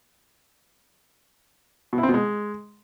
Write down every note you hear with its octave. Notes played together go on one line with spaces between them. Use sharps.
B2
E4
C4
B2
G#3